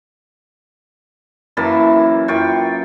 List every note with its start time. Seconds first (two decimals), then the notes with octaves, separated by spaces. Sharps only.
1.57 F#2 E3 A#3 A5
2.28 F#2 F4 G5 C#6